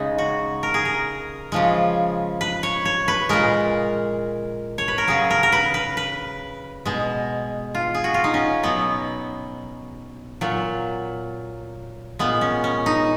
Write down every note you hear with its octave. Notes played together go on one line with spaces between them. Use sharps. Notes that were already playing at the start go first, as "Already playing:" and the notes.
Already playing: C#3 G#3 D#4
F#4
A#4
G#4
A#4
C#3 F3 G#3
B4
C#5
C#5
B4
A#2 G#3 A#4
C#5
B4
A#4
C#3 F#3 G#4
A#4
A#4
B4
B4
B4
B2 G#3
F4
G#4
F#4
F4
D#4
C#4
B2 F#3 B3
A#2 F#3
A#2 G#3 B3
C#4
C#4
D#4